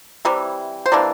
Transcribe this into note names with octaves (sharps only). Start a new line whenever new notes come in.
C3 E3 G3
C5
C3 E3 A#3 D4 D5